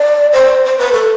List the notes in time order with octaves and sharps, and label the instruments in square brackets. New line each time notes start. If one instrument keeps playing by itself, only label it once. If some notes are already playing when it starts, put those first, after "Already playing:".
Already playing: [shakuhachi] D5
C5
C5
B4
A4